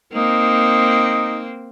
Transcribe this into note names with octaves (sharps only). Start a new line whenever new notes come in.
A#3 C4 D#4